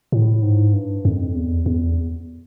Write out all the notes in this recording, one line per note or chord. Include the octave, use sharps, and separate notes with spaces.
A2
G#2
G2
F2
E2
E2